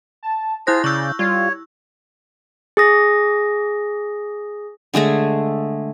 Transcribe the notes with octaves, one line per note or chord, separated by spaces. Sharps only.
A5
E4 F4 G#4 C5 F#6 A#6
C#3 D5 C#6 E6 G6
G3 F4 C#5
G#4 D#6 A#6
D3 G#3 A3 G#4